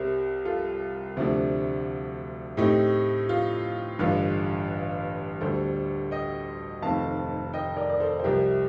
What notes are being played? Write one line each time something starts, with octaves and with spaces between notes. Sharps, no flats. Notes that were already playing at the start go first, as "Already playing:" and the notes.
Already playing: C2 C3 G3 C4 G4 A#4
F4 A4
D2 C3 F3 A3 D4
A2 A3 C4 D#4 G4
F4
A1 G2 D3 F4
D2 D3 G3 A4 C5
D#5 G5
F1 F2 D#3 A3 C4 F5 A5
D#5 G5
A#4 D5
D5
A4 C5
C5
C2 C3 F3 G4 A#4